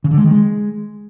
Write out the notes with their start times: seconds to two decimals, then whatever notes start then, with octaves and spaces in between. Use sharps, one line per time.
0.04 C#3
0.11 D3
0.18 G#3
0.24 D#3
0.31 G#3